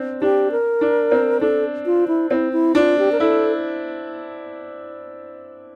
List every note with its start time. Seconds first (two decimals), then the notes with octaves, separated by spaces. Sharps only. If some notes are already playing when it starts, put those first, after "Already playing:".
Already playing: C4 D4
0.22 D4 G4
0.52 A#4
0.81 D4
1.12 C4
1.41 D4 A4
1.86 F4
2.08 E4
2.31 C4 E4
2.53 E4
2.75 D4 F4
2.98 G4
3.12 A#4
3.20 E4 A4